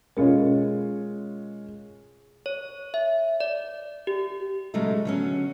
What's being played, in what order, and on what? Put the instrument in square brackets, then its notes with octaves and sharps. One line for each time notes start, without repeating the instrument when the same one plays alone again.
[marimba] B2 C#4 A#4 [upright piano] G#3 F4 C#5
[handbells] C#5
E5
D5
G4
[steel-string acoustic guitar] A#2 C#3 F#3 G#3 A3
D3 F#3 C#4